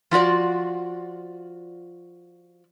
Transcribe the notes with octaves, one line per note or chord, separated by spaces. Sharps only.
F3 F4 F#4 D5